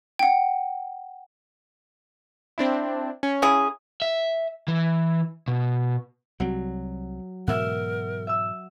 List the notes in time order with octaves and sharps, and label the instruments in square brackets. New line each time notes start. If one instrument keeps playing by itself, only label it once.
[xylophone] F#5 G5
[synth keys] C4 D4 E4
C#4
[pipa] C#3 E4 G#4
[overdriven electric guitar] E5
E3
B2
[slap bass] C2 G3 C4 [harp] F#3
[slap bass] G#2 B2 E3 [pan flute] A#4 [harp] E5 F#5
[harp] E5 E6